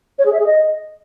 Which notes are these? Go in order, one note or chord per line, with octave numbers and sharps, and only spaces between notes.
C#5
G#4
E5
G#4
D#5